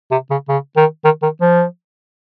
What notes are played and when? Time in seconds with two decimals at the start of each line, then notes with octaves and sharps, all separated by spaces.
0.11 C3
0.31 C#3
0.49 C#3
0.77 D#3
1.04 D#3
1.22 D#3
1.41 F3